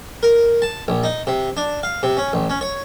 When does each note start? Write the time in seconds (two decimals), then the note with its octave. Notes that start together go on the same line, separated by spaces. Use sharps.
0.23 A#4
0.62 A5
0.88 A#1
1.04 D#4
1.27 C3
1.57 D4
1.83 F5
2.03 C3
2.17 C#4
2.33 A1
2.50 C#4
2.61 C#5